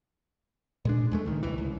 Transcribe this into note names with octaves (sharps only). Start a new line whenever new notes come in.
A#2 G#3 D4
E2 G#3 A3
C#2 D#3
C2 E3
C#2